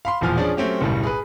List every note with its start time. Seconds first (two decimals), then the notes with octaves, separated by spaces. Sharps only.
0.05 F5 B5 C6
0.21 E1 E2 A#2 F3 G#5 F6
0.37 F3 C#4 D4 G#4 D5
0.57 F#3 A3 C4 C#4 G4
0.81 F#1 B1 A2 G3
1.04 G#4 B4